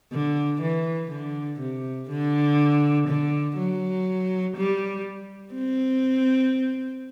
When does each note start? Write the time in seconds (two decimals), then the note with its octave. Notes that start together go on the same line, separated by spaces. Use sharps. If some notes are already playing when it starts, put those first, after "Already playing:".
0.12 D3
0.61 E3
1.11 D3
1.60 C3
2.09 D3
3.08 D3
3.57 F#3
4.56 G3
5.54 C4